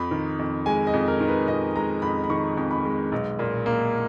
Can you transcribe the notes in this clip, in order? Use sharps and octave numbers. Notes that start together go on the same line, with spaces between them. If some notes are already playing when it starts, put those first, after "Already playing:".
Already playing: F2 B5
D#3
F2
G#3 G#5
D#5
F2
A#4
D#3
B4
F2 D#5
G#3 A#5
F2 B5
B5
D#3 C#6
F2
B5
G#3
B1
A#2
A#3